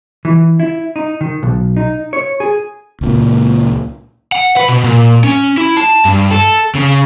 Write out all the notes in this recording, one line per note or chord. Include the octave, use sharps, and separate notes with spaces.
E3
E4
D#4
D#3
B1
D#4
C#5
G#4
C#2 A#2
F#5
B4
B2
A#2
C#4
E4
A5
G2
A4
C#3